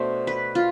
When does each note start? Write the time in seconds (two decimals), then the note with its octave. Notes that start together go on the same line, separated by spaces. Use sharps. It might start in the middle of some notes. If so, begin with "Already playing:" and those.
Already playing: B2 A3 D4 C5
0.27 B4
0.55 F4